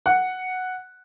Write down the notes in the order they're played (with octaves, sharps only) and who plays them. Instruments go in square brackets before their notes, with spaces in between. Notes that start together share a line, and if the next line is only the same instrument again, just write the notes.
[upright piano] F#5